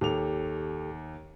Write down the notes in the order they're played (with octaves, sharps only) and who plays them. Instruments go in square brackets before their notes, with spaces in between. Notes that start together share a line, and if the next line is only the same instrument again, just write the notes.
[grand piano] D#2 F7 [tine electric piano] G4 A4